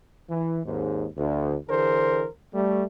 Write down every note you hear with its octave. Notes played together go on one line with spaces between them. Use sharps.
E3
G#1 D#2 G#2
D2
D3 E3 G#4 A#4 C5
G3 A3